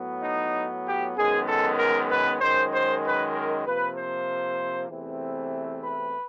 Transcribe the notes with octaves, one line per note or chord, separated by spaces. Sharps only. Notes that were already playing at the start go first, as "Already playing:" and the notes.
Already playing: A2 F#3 B3
D#4
G4
F#2 D#3 G#3 B3 G#4
A4
A#4
B4
F#2 D#3 G#3 C5
C5
B4
A#4
C3 F3 A#3 B4
C5
E2 C3 E3 A3 C4
B4